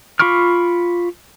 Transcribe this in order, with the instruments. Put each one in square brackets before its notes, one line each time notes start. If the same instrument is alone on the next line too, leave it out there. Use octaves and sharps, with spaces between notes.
[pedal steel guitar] F4 B5 C#6 D6 F6